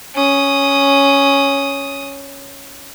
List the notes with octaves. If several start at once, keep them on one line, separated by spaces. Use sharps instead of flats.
C#4 D#6